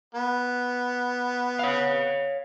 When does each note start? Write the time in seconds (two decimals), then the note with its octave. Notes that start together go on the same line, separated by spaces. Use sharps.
0.15 B3
1.59 C#5 F5